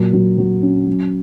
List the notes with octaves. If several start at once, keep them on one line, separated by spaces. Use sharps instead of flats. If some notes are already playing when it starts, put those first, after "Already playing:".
Already playing: A#2 F#3
F#3
F#3
C#4
F#3